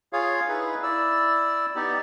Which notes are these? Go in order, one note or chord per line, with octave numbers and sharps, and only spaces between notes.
F4 G#4 C#5 F5
D#4 E4 G#4 B4
E4 D5 E6
B3 D#4 G4 D5